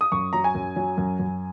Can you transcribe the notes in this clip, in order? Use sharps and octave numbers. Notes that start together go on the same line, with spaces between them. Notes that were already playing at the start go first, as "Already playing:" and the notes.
D#6
F#2 C#6
F#3 A#5
G#5
F#2
F#3
F#2
F#2